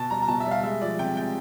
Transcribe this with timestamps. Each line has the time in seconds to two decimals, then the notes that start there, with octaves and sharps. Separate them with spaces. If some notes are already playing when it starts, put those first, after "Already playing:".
Already playing: B2 A5
0.11 G3 A#5
0.22 A#5
0.28 B2 A5
0.40 E5
0.46 G3
0.51 F5
0.63 G#3 E5
0.81 F3 D5
0.99 C3 G5
1.16 G#3 G5